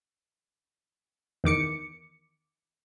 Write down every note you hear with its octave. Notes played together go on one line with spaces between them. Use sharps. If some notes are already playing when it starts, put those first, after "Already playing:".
E2 D#3 D6 C#7